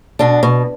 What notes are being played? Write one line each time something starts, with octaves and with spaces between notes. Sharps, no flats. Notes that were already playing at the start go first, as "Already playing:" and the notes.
B2 D4
B2